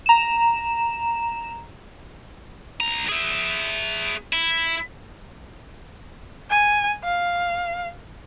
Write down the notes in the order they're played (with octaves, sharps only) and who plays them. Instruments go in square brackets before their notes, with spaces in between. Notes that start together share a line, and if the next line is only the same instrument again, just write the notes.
[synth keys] A#5 E7
[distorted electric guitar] C2 A#5
G#4 E5
E4
[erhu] G#5
F5